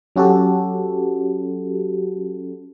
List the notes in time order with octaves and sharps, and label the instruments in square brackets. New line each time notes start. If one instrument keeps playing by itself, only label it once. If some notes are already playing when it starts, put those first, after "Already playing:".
[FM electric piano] F#3 C#4 F#4 G4 A4